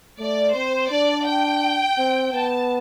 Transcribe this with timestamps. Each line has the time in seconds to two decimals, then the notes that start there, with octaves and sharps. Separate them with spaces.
0.19 A3 D5
0.55 C4 C5
0.90 D4 D5
1.27 G5
1.98 C4
2.33 B3 A5